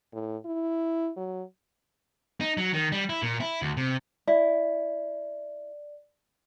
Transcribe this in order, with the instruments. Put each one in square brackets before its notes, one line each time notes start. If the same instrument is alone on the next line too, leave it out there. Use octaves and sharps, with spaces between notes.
[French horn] A2
E4
F#3
[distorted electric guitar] D#4
F#3
D#3
G3
E4
A#2
E4
D2
C3
[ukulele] E4 [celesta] D5